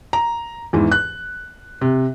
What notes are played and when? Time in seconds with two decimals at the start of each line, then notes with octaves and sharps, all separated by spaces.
0.13 A#5
0.73 E2 G#2 E3
0.92 F#6
1.81 C3